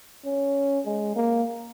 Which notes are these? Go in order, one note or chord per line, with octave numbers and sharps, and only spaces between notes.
C#4
G#3
A#3